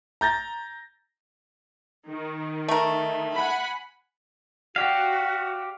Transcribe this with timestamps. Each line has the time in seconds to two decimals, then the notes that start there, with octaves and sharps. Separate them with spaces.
0.21 A#5 G6 A6 A#6
2.08 D#3
2.68 A3 A#4
3.35 F#5 G#5 B5
4.76 F#4 G4 D5 F5 G5